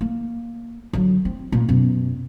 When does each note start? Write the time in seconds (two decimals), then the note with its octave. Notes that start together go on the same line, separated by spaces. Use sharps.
0.01 A#3
0.93 D3 F#3
1.25 C4
1.52 A#2
1.68 F#2 B2